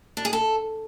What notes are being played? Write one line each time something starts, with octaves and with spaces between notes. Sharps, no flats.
D4
G#4
A4